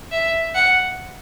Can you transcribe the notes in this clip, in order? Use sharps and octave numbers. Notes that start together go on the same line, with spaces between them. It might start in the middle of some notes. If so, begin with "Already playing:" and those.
E5
F#5